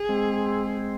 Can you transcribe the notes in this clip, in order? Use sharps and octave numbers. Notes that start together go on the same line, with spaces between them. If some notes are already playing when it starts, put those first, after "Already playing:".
Already playing: G#4
G#3 C4